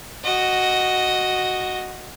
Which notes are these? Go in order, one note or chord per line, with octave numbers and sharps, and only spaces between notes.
F#4 D#5